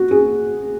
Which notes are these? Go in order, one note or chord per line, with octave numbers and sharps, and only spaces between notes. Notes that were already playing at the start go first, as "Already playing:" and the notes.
Already playing: F#4
G#4